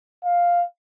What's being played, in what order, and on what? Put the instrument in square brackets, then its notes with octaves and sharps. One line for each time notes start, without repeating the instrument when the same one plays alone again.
[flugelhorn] F5